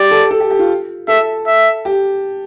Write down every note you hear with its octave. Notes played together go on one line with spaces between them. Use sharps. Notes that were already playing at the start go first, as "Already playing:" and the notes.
Already playing: G4 D5
A4
A4
G4
G4
F4
A4 E5
E5
G4